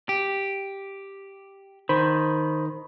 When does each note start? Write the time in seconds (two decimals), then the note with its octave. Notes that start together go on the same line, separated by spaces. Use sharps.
0.09 G4
1.89 D#3 C5 B5